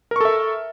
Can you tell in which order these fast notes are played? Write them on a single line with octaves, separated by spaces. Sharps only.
A#4 C#6 A4 E5